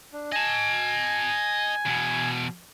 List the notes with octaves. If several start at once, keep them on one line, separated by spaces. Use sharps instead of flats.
D4
D#5 G#5 A5
E2 B2